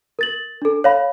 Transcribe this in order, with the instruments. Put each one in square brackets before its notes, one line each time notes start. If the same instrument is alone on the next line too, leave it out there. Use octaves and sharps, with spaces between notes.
[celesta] A#4 A6 F#7
D4 A4
C#5 F5 B5